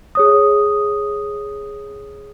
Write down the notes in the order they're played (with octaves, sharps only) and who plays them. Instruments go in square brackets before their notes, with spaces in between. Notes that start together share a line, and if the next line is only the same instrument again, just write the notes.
[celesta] G#4 C#5 D#6